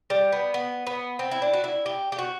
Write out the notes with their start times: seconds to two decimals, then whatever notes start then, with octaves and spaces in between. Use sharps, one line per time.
0.10 G3
0.32 B3
0.54 B3
0.87 B3
1.19 C4
1.31 E4
1.42 D4
1.53 F#4
1.64 E4
1.86 G4
2.12 G4
2.19 F#4